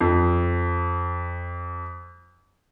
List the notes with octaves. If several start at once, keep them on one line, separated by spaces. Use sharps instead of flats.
F2